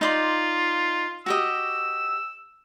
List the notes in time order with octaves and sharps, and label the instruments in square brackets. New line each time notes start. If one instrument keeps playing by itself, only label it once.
[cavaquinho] D#4 D5 C6 [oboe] F4
[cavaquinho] F#4 G4 D#5 [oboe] E6